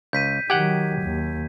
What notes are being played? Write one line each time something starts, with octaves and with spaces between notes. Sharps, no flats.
C#2 G6 B6 D#7
D#3 F#3 G4 F#5 G5 G#6
D#2